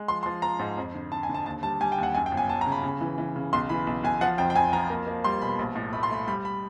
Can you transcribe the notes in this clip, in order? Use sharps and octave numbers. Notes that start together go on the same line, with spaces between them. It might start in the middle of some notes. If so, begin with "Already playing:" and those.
Already playing: G#3
F3 C6
C6
F3
F3 A#5
G#2
F2
D3
D3 A5
G#5
D3
A5
D#2 A5
G3 A5
G3 G#5
G5
D#2 F#5
F#2 G#5
G5
G1
G#5
G1 A5
A#5
C#3
B5
C#3
E3
E3
C#3
B1 C6
E3 B5
B1
B1 G#5
F3 F#5
F2 G5
G5
F2 G#5
F3 A#5
A#3
A#3
G3 C6
B2 B5
A#1
A2
A3 B5
C6
A3 B5
G3 B5
B5